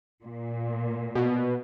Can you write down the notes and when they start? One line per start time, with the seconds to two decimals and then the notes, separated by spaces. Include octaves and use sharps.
0.25 A#2
1.15 B2